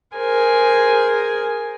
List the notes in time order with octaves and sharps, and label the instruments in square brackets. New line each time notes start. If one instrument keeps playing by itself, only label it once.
[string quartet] G#4 A#4 C5 G#5